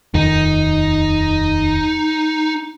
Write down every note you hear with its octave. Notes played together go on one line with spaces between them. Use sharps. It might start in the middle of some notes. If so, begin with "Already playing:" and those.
D#1 F2 D#3 D#4